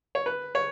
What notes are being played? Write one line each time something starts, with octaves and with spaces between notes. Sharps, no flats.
C#5
B4
C#5